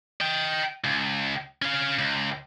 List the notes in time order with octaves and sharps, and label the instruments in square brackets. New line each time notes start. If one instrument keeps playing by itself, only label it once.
[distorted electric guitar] D#5 G5
C#2
C#4 F5
C#2